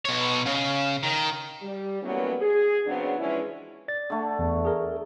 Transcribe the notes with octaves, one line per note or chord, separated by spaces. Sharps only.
B2 C#5
C#3
D#3
G3
E3 F#3 G3 A#3 B3 C#4
G#4
C#3 F#3 B3 C4 D4
E3 F3 G#3 C#4 D4 E4
D5 A6
D3 A3
E2
G#4 A#4